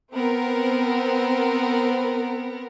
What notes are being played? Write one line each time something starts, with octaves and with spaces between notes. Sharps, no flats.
B3 C4 A#4